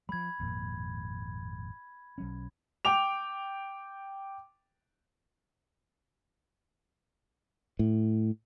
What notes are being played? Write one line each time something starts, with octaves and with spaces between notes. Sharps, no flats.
F3 G3 B5 G#6
G#1 F2 A#2
B1 F#3 C#4
G5 D6 F7
A2